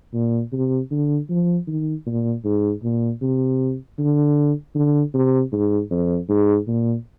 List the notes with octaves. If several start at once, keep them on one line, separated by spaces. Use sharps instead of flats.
A#2
C3
D3
F3
D#3
A#2
G#2
A#2
C3
D3
D3
C3
G#2
F2
G#2
A#2